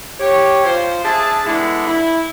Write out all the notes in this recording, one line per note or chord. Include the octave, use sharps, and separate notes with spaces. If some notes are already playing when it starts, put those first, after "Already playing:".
G4 C#5
F3 F4 C5
D4 G#4 E5 A5
G#3 B3 D4 E4 A4
E4